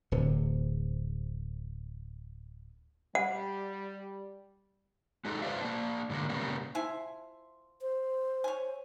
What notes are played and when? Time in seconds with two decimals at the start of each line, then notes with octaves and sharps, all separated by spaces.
0.12 D1 C3
3.15 G3 F#5
5.25 G#3 D#4 G4 A4
5.42 F4 B4 C5 D5 E5 F5
5.61 A#3 D4
6.10 G#2 D3 G#3 A#3
6.29 A#2 C#3 G3 A#3 B3
6.75 F3 E4 G#5
7.81 C5
8.44 C#5 G#5